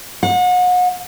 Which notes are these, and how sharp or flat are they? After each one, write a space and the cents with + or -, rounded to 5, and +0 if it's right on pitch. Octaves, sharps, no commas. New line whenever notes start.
F#5 -35